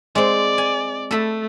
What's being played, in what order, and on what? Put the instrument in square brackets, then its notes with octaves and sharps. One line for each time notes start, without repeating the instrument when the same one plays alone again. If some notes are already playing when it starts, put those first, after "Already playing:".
[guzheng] G#3 C4 [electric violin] D5
[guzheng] G#5
[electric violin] A3 [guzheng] A4 B5